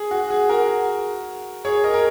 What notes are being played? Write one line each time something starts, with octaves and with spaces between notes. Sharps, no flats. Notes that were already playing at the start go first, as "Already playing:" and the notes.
Already playing: G#4
F#4
G#4
F#4 A#4
G#4 C#5
A#4 D#5
A#4